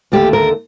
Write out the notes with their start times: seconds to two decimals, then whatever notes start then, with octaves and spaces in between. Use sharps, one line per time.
0.12 D#2 D3 A3 G4
0.33 A#4